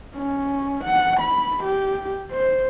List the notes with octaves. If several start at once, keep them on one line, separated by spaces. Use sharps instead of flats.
C#4
F#5
B5
G4
C5